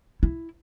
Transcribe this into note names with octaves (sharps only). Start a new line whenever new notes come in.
E4